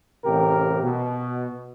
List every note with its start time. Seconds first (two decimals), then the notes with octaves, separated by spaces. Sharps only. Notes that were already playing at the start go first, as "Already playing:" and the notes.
0.25 A1 C3 G4 A#4
0.83 B2